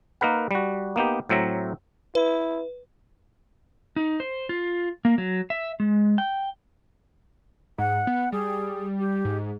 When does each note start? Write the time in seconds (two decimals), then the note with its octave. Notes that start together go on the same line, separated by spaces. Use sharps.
0.21 A#3 D#4 A#4 B4 F#5
0.51 G3 F#4
0.96 A#3 B3 D#4 G4
1.29 A2 F#3 C4 E5 A#5
2.15 E4 B4
3.96 D#4
4.20 C5
4.49 F4
5.05 A#3
5.18 F#3
5.50 E5
5.80 G#3
6.18 G5
7.78 G#2 F#5
8.07 B3
8.32 G3 G#4
8.99 G4
9.25 G#2